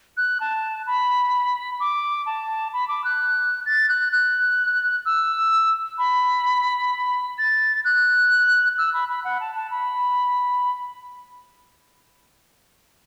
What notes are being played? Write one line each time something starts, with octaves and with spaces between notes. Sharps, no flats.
F#6
A5
B5
D6
A5
B5
D6
F#6
A6
F#6
F#6
E6
B5
A6
F#6
E6
B5
B5
F#5
A5
A5
B5